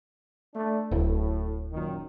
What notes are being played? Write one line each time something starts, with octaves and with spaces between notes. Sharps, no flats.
A3 D4
D1 A2
F#2 A#2 D#3